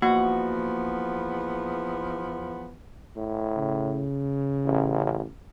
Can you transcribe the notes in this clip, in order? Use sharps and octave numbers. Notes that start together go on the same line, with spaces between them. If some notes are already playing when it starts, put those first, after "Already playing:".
E2 F3 A#3 B3 F#4
A2
C#3
A1